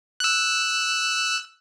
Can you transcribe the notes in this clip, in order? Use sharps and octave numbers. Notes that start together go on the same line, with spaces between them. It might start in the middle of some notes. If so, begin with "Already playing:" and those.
E6 F#6